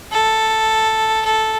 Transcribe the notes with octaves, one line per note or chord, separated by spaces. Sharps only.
A4
A4